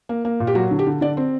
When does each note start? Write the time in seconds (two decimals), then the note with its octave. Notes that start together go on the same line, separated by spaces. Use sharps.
0.09 A#3
0.25 A#3
0.40 A#2
0.47 G4
0.55 F#3 F#4
0.71 D3
0.79 G4
0.87 D3
1.01 D3 D5
1.17 C4